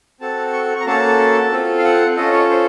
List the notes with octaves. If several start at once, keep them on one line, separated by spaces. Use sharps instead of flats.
C4 F#4 A4 A5
C#6
C#6
A#5
A#3 C#4 F#4 A4 A5
C4 F4 A4
F5
F#5
C#4 F4 A4 D#5
C#5
C5